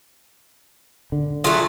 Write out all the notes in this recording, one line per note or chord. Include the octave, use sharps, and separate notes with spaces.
D3
F#3 A3 F4 G#4